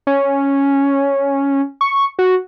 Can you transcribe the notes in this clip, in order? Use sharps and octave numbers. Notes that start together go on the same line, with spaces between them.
C#4
C#6
F#4